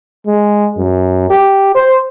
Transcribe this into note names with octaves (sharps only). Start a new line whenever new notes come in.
G#3
F#2
G4
C5